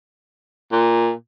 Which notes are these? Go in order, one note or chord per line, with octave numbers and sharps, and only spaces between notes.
A#2